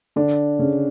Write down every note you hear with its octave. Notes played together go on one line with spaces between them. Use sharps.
D3 D4
C#3 C#4